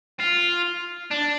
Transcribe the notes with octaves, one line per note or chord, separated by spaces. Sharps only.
F4
D4